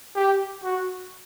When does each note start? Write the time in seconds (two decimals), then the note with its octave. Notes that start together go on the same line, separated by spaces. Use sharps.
0.15 G4
0.63 F#4